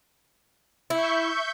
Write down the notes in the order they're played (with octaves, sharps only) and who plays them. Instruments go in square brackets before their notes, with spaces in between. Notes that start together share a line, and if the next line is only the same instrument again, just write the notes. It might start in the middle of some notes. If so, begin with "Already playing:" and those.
[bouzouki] E4 [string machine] E5 C#6 G6